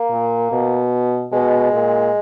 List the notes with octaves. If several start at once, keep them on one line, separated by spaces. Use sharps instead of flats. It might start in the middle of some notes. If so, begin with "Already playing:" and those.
Already playing: A#3
A#2
B2
B2 G#3
A#2